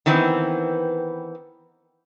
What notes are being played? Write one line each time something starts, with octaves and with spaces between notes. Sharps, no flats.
D#3 E3 B3 C4